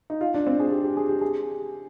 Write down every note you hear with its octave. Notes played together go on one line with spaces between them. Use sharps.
D#4
F4
D4
C4
G#4
G4
G4
G#4
G4
G#4